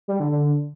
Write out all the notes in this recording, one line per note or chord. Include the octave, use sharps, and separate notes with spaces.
G3
D3
D3